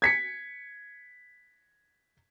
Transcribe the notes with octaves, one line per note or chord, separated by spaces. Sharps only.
G#6 B6 C#7